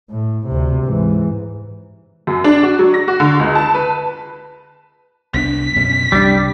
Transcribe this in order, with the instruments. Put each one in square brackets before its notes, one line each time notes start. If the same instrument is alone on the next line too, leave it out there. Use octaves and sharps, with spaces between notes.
[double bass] A2
D2 C3
G#2 E3
[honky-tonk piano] F#2
D4
F#4
F#3
A#6
F#4
D3
C#2
A5
B4
[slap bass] C2 B3 D4 [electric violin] B6
[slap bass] F#2 B2 C#4
[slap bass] C2 F#3 D4 [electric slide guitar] G3